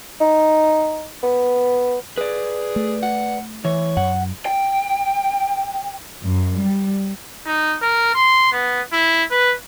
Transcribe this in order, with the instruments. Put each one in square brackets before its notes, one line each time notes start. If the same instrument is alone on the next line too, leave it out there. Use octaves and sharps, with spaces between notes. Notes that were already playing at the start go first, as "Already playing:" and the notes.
[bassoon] D#4
B3
[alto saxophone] G#4 [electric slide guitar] B4 D5
[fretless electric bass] A3
[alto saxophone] F#5
[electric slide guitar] E3 [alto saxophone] C#5
[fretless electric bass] F#2 [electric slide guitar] F#5
[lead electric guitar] G5
[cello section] F#2
G3
[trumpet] D#4
A#4
C6
B3
E4
B4